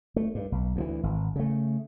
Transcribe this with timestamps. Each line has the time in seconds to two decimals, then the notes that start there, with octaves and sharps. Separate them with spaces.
0.16 A3
0.35 G2
0.52 B1
0.76 D2 D3 E3
1.03 G#1
1.36 C#3 A3